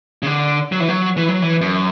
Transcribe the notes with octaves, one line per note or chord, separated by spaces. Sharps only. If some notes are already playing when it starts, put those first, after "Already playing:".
C#3
D3
F#3
E3
F#3
E3
F#3
E3
F#2